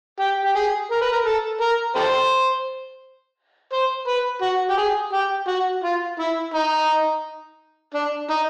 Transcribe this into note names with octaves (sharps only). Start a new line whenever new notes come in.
G4
G4
G#4
A#4
B4
A#4
A4
A#4
G4 A4 C5
C5
B4
F#4
G4
G#4
G4
F#4
F4
E4
D#4
D4
D#4